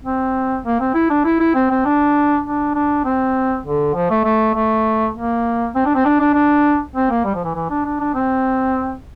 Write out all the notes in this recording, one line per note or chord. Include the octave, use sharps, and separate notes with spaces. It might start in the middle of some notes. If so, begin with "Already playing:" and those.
C4
A#3
C4
E4
D4
E4
E4
C4
C4
D4
D4
D4
C4
D3
F3
A3
A3
A3
A#3
C4
D4
C4
D4
D4
D4
C4
A#3
G3
F3
E3
E3
D4
D4
D4
C4